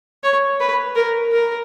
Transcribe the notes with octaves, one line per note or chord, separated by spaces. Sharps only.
C#5
B4
A#4
A#4